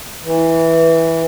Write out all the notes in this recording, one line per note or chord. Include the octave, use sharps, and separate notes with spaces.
E3